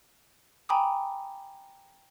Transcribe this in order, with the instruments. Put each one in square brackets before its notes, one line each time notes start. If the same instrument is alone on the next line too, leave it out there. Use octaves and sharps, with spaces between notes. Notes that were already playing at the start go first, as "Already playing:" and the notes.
[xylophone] G5 G#5 A#5 B5 D6 D#6